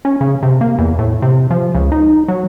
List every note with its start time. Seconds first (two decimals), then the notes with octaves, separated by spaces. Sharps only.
0.05 C#4
0.21 C#3
0.43 C3
0.61 A#3
0.78 E2
0.99 A2
1.22 C3
1.50 F3
1.74 C#2
1.92 D#4
2.28 F#3